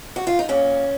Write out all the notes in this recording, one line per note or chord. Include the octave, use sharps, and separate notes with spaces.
F#4
F4
D#4
A#2 C#4